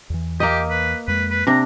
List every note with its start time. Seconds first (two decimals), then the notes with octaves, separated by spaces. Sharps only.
0.10 E2 E3
0.40 A#3 G4 D#5
0.70 B4
1.08 F2 G#3 B4
1.31 B4
1.47 C3 D4 A#5